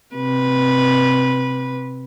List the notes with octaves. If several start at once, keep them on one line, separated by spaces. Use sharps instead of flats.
C3 B4